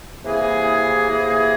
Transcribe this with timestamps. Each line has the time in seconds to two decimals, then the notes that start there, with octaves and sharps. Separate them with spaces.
0.25 C3 E3 A#3 E4 G#4
1.10 C3 E3 A#3 E4 G#4